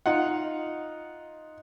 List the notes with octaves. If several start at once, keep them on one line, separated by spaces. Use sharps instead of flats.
D#4 F4 F#5